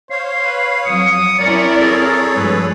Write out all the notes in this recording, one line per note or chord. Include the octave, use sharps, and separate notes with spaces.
C5 C#5 F5 C7
B4
F2 F#3 D#6 C#7
C4 C#4 E4 A#4 C#5 D5
G#4 A4 C#5 A6
G2 F3 G#3 B4